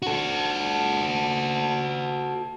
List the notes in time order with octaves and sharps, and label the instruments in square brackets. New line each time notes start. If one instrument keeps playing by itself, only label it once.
[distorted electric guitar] F#4 A4